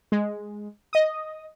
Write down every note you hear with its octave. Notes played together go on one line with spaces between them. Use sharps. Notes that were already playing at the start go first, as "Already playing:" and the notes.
G#3
D#5 D#6